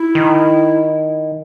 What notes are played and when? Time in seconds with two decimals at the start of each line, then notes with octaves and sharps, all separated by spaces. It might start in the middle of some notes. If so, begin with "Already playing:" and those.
Already playing: E4
0.15 D#3